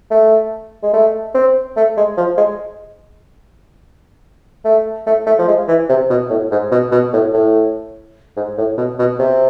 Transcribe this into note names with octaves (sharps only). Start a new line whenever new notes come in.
A3
G#3
A3
C4
A3
G#3
F3
G#3
A3
A3
A3
F3
G#3
E3
C3
B2
A2
G#2
B2
B2
A2
A2
G#2
A2
B2
B2
C3